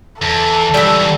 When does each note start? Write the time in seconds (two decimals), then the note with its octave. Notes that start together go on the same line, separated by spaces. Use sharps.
0.22 E2 A4
0.74 E3 F#3 G3 D5 E5